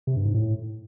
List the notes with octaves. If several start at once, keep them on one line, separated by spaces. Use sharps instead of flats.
C3
G2
G#2
A2